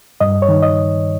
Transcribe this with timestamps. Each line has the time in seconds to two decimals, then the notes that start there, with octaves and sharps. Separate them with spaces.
0.21 G2 D#5
0.42 C#5
0.49 D#3
0.63 D#5